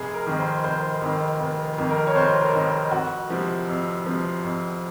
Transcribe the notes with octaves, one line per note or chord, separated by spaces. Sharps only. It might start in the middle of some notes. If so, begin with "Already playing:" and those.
Already playing: F1 G#4
A#4
F2 D#3
C5
F1 C5
F2 D#3
F1
F2 D#3
A#4
C#5
F1 C5
A#4
F2 D#3
F2 F#4
C3 F3 C4
F2
C3 F3 C4
F2